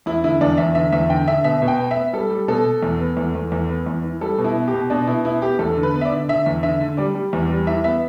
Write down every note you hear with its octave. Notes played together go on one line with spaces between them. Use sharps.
E2 E4
D3 E4
E2 D4
E2 E5
D3 E5
E2 E5
D3 G5
D3 E5
B2 E5
B2
G5
B3
E5
B3
G3 A4
G3
B2 A4
B2
E2
B3
E2
E2
E2
B3
E2
E3
G3 A4
B2
E4
B3
G4
B2
B2 D4
B2 E4
B3 E4
B3 G4
E2 A4
D3
B4
B3
E5
D5
D3
D3 E5
E2
D3 E5
D3
G3 D5
G3
E2
G3
E3 E5
B3 E5